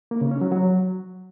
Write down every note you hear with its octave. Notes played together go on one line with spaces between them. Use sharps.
A#3
C#3
C#4
F#3
F#3